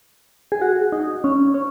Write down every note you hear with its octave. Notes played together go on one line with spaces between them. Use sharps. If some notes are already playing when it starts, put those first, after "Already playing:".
G#4
F#4
D#4
C#4
C#4